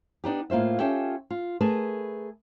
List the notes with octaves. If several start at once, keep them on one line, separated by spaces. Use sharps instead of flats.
B3 D4 D#4 G4
A2 A#3 F4 C5 E5
C#4 F4 G4 A4 E5 G5
F4
A3 G#4 A#4 B4 A5